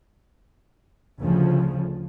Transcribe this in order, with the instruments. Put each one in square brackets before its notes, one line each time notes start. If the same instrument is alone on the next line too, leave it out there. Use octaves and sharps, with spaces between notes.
[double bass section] D2 C#3 F3